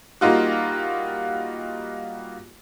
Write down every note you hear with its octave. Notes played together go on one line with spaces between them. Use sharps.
G3 A#3 D#4 F4 F#4